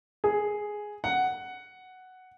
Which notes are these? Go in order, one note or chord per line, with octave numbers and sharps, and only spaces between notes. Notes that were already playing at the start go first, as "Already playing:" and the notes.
G#4
F#5